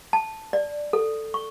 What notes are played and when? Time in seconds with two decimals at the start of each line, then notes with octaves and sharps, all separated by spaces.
0.13 A5
0.53 D5
0.93 A4
1.34 C#6